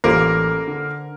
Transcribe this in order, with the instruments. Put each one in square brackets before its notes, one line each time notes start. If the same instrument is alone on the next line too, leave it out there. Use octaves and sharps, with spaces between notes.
[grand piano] A1 [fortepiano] G3 A#3 F4 [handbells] A4 C5 [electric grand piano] A#4
[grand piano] D3